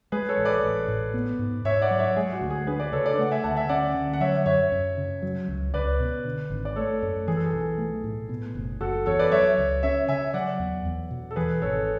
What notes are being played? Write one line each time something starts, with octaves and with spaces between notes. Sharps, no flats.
G#3 G#4 B4
A4 C#5
A1
B4 D5
A1
A2
B3
G#2
G#2 C#5 E5
D5 F#5
F#3
C#5 E5
G#3 G#4
F#4
D2
G#4
D4 G#4 B4
B4 D5
C#3 A4 C#5
B4 D5
A3 F#5
E5 G#5
D2 F#5 A5
E5 G#5
C#4 D5 F#5
D3
F#5
F#3 C#5 E5
F#2 C#5 E5
F#2
C#3
F#3
C#2
C#2 B4 D5
B2
D3
G#1
D5
A3 A4 C#5
F#2
E3 G#4
A4
G#4
B1
A3
A2
B2
F#1
F#1 F#4 A4
E2 A4 C#5
B4 D5
F#3 C#5 E5
C#2
C#4 C#5 E5
C#3 E5 G#5
F#3 D5 F#5
E2
E2
B2
A4
E3 G#4 B4
G#1 A4 C#5